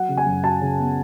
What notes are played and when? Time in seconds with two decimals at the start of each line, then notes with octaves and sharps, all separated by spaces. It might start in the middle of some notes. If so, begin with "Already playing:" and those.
Already playing: F#3 F#5
0.09 C#3
0.17 G#5
0.26 F#2
0.43 F#3 A5
0.61 C#3
0.79 B3